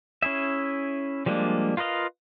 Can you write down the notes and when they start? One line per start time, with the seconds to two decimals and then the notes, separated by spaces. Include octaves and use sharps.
0.22 C#4 E4 G#4 E5
1.26 F3 G3 G#3 A#3 D4
1.77 F4 A#4 B4 D#5 F5